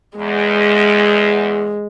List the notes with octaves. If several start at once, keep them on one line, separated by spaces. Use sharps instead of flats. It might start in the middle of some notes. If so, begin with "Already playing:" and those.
E2 G#3